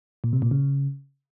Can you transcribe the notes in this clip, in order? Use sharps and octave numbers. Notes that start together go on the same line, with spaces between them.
A#2
C3
A#2
C#3